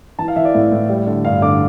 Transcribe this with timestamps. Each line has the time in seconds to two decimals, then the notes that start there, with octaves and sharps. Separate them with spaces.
0.19 E3 A5
0.28 F5
0.36 E3 E5
0.45 D5
0.54 A2 E5
0.72 A2
0.89 G3
1.07 D3
1.25 G2 F5
1.42 D3 D6